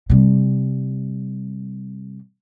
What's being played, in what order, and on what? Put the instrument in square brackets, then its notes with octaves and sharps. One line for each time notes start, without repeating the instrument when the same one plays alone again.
[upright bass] C3 G3